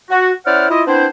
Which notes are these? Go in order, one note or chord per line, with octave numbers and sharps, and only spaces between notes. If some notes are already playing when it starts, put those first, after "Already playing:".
F#4
C#4 E4 C5 D5 F#5 F6
E4 F4 D#5
B3 C4 D4 E4 C5